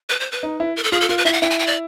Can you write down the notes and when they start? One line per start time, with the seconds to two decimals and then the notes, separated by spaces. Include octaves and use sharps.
0.10 B4
0.20 C5
0.32 B4
0.43 D#4
0.60 E4
0.76 A#4
0.84 A4
0.92 F4 G#4
1.01 A4
1.09 F4 A#4
1.18 B4
1.25 E4 E5
1.33 F#5
1.42 E4 G5
1.50 G#5
1.59 G5
1.67 D5